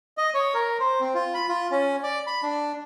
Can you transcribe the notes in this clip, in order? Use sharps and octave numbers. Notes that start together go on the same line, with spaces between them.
D#5
C#5
A#4
C5
C4
F4
B5
F4
C#4
D5
B5
D4